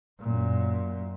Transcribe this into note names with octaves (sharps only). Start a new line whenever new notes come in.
F#2 A#2